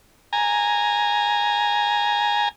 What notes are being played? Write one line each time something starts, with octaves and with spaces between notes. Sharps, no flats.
G#5 A#5